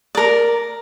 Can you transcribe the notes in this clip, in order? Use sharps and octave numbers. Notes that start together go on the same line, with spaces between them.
A#4 D5